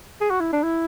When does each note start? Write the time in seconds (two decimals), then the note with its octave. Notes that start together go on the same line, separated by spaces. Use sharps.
0.21 G#4
0.30 F#4
0.41 E4
0.53 D4
0.63 E4